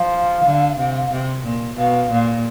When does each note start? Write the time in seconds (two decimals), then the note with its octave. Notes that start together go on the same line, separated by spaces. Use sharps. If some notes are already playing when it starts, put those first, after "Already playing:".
Already playing: F3 F5
0.44 D3
0.77 C3
1.11 C3
1.44 A#2
1.76 B2 F5
2.10 A#2